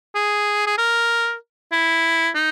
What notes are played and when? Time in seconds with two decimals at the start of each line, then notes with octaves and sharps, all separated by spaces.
0.15 G#4
0.67 G#4
0.78 A#4
1.72 E4
2.35 D#4